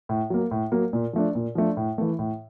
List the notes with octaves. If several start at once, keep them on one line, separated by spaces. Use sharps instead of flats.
A2
F#3 A#3
A2
F#3 A#3
A#2
F3 A3 D4
A#2
F3 A3 D4
A2
E3 A3
A2